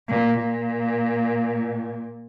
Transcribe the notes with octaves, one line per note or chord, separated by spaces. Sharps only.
A#2
A#2